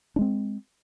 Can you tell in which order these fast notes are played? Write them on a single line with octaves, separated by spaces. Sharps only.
D4 G#3 C4